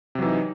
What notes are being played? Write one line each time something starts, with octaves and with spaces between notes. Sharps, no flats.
C3 E3 F#3 D#4